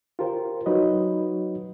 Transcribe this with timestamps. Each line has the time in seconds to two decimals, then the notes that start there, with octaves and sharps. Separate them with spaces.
0.19 F4 G4 A#4 C5
0.66 F#3 D#4 F#4 B4 C#5 D#5